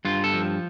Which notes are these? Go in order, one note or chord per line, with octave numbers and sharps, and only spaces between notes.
G2 F4
A4
F3